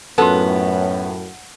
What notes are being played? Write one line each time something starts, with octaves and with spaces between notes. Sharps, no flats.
F#2 A2 B3 F4 A4